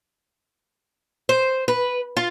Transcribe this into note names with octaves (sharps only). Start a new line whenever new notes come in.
C5
B4
F4